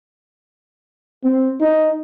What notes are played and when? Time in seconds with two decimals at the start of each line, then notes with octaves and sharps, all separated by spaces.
1.24 C4
1.60 D#4